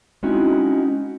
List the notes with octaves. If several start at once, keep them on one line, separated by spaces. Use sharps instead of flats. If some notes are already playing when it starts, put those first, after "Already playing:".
G#3 C4 C#4 D#4 E4 F#4